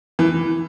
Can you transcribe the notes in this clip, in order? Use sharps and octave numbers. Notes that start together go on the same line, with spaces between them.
E3